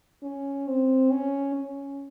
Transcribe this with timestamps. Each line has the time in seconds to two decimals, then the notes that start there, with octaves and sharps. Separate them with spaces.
0.23 C#4
0.67 C4
1.11 C#4
1.55 C#4